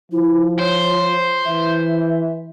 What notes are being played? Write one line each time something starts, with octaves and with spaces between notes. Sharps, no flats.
F3 E4
C5 C#5
E3 E5